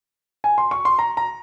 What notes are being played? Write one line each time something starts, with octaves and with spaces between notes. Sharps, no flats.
G#5
C6
C#6
C6
A#5
A#5